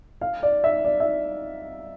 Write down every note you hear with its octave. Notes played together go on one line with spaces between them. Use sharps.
F5
D5
E5
D5
E5